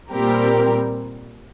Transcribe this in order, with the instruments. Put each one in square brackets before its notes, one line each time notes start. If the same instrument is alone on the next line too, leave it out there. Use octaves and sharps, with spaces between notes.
[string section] A#2 G3 C4 G4 A#4